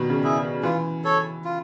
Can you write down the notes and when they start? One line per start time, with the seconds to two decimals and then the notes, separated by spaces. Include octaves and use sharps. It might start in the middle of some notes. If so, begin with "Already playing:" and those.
Already playing: B2 D#3 G3
0.10 C#3
0.23 E4 G#4
0.63 E3 F4
1.04 A4 C#5
1.45 F4